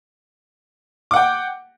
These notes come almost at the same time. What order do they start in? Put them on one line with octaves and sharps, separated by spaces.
D6 F#5 G5